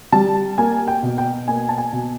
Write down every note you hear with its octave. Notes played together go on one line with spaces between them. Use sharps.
G3 A5
A#3 G#5
G5
B2
G5
A#3 G#5
A5
G#5
B2